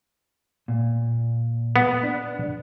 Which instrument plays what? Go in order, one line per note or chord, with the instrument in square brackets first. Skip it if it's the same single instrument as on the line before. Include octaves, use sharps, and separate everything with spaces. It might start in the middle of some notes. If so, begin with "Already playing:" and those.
[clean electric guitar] A#2
[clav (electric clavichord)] B3
[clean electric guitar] D4